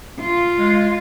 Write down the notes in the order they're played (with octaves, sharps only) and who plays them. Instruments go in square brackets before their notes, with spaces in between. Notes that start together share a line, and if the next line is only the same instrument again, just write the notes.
[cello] F4
[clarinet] G#3